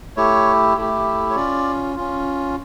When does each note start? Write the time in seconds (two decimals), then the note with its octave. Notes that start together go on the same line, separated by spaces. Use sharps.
0.17 A3 E4 G4 C#5
0.77 A3 E4 G4
1.30 C#5
1.36 C#4 F4 D5
1.96 C#4 F4